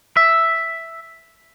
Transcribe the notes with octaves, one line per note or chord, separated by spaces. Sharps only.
E5